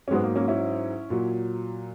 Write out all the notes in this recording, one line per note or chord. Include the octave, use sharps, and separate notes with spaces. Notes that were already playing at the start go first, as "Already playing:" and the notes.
C#4
G#2 F#3 G#3 B3
A#3
A#3 C#4
C#4 E4
A#2 F#3